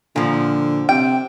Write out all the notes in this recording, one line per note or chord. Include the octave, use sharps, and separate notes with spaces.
A#2 D3 F3
C3 G5